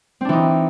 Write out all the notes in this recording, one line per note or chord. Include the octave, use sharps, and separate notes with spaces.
E3 C4 D4 D#4